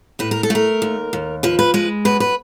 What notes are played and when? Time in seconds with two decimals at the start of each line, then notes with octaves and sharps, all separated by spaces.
0.19 A2 B4
0.31 A#4
0.43 A4
0.50 A3 A#4
0.82 D#2
1.13 D#2
1.43 F3 B4
1.59 B4
1.74 G#3 B4
2.05 F#2 B4
2.20 B4